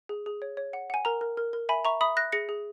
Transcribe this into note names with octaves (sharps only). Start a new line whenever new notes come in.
G#4
G#4
C#5
C#5
F#5
F#5 G#5
A#4 A#5
A#4
A#4
A#4
E5 G#5 B5
E5 A#5 C#6
E5 B5 D#6
E5 F#6 A#6
G#4 A#6 C#7
G#4